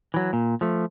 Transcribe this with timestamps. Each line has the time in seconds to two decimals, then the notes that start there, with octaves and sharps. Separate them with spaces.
0.14 E3 F#3
0.33 A#2
0.61 F3 A3